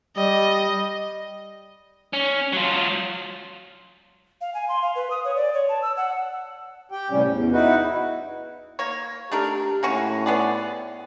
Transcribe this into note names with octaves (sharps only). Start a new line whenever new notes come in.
G3 D#5
C#4
F#3 F4
F5
G#5
C6
F5
B4
D#6
C#5
D5
C#5
A5
E6
F#5
G4 G5
A2 C3 G3 C#4
E2
D#4 E4 F#4 B4
A#3 C#5
A3 D4 G4 A#4
A2 A#3 C#4 F#4
B3 G#4 D5